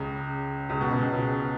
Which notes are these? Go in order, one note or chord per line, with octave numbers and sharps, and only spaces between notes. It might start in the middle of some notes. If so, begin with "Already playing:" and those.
Already playing: C#2 C#3
C#2 C#3
B2
C#2 C#3
B2
C#2 C#3